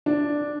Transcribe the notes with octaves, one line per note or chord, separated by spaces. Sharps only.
D4